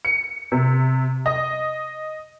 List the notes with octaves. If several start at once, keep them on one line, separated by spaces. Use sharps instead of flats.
C#7
C3
D#5